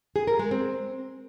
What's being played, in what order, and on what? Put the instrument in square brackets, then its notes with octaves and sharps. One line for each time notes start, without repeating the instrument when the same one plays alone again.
[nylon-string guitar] G#4
A#4
G#3
C4